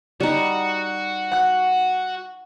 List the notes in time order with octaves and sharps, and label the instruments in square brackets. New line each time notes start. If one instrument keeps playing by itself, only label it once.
[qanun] G3 D#4 [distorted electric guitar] F#4
[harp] F#5 F#6